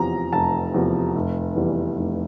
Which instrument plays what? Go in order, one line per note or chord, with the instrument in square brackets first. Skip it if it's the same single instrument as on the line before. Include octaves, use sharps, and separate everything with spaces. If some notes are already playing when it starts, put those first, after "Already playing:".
Already playing: [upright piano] F1 E2 C3 F3 A#5
F1 A5
E2 C3 F3
F1
E2 E3 G3
F1